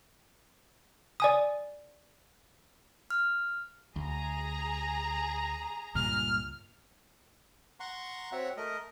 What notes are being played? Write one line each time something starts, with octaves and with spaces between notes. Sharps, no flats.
D5 G#5 D#6
F6
D2 G#4 A#5
C#2 G2 A#2 F6
F#5 A#5 C6 C#6
C4 F#4 C#5 E5 F#5
A3 A#4 D#5